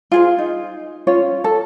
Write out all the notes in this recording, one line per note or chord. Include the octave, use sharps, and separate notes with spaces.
F4 G#4 C5
D#4
C#4 F4 C#5
A4